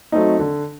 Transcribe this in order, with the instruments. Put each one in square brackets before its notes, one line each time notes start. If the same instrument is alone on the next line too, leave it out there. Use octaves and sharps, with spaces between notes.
[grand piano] F#3 A3 C4 D#4
D3